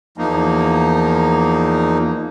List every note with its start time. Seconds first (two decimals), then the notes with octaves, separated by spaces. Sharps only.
0.18 E2 F3 A#3 D#4